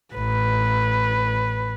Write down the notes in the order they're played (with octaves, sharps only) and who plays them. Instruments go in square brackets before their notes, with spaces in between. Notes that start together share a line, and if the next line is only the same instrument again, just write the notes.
[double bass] A1 [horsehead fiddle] B4